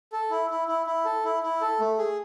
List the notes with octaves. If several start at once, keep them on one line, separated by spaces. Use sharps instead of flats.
A4
E4
E4
E4
E4
A4
E4
E4
A4
A3
G#4